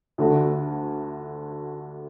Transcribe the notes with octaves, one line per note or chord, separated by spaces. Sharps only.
D2 D3 A3 F#4